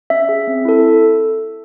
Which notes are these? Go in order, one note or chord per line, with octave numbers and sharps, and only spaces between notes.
C#4 E5
G#4
C4
E4 A4